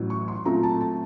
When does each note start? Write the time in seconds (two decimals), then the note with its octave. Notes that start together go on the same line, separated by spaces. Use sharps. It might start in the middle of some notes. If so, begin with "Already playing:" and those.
Already playing: A1 A2 F#3
0.10 C#6
0.28 C6
0.45 A#2 F#3 A3 C4 F4 A#5
0.63 A5
0.81 A5